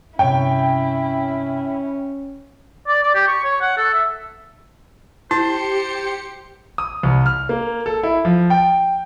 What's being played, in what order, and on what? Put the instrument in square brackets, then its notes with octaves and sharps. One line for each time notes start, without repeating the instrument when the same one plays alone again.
[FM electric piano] G2 C3 [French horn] C#4 [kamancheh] E4 [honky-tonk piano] C#5 G5
[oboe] D5
D5
G4
C#6
C#5
F#5
A4
E5
[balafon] E4 [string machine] G4 C#7 [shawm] C5 [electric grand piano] A5
[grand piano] D#6
C2
F6
A#3
A4
E4
F3
G5